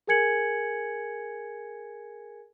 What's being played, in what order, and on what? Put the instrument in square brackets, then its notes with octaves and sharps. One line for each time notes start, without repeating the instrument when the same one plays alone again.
[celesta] G#4 A#4 G#5 G#6 C#7 F#7